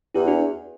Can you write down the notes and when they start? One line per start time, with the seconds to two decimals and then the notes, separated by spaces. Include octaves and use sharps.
0.15 E2 E4 G4
0.27 D4 F#4